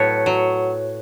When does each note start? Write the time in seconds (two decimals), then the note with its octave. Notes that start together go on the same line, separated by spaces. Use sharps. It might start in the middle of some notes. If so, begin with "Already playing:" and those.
Already playing: A2 F#3 A4 B4 C#5
0.26 F#3